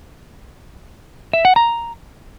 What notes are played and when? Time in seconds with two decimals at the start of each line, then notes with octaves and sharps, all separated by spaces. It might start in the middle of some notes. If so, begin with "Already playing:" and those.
1.33 E5
1.45 F#5
1.56 A#5